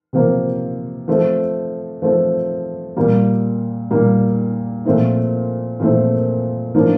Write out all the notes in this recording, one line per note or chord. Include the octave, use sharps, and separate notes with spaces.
C3 F3 A#3
F3 A3 C4
F3 A3 C4
A#2 G3 A#3
A#2 G3 A#3
A#2 F3 A3 C4 E4
A#2 F3 A3 C4 E4
A2 F3 A#3 D4